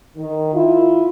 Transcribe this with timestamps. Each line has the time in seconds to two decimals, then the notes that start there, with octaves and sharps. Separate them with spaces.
0.17 D#3
0.54 E4 F4